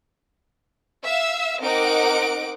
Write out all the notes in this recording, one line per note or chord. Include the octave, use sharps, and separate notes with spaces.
E5 F5 E6
C4 D#4 A#4 F#5 D6 D7